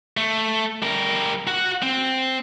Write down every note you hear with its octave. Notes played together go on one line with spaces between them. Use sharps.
A3
G3 A#4
F#4 F#5
C4